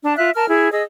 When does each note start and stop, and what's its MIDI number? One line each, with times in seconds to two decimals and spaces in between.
0.03 0.16 62
0.03 0.16 81
0.17 0.30 65
0.17 0.30 76
0.17 0.30 90
0.34 0.47 70
0.34 0.47 81
0.34 0.47 89
0.48 0.71 64
0.48 0.71 68
0.71 0.82 68
0.71 0.82 75
0.71 0.82 88